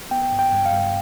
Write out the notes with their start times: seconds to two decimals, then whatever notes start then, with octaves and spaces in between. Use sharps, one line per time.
0.11 B3 G5
0.32 G2
0.39 G5
0.53 G2
0.65 F5
0.73 G2